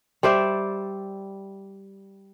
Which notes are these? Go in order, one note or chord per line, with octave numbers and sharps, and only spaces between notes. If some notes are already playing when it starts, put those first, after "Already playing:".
G3 C5 D5 E5